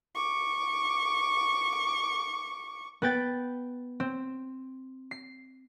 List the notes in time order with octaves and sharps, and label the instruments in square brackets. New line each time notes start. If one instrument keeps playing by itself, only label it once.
[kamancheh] C#6 D6
[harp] B3 B4 G5 A6
C4
C7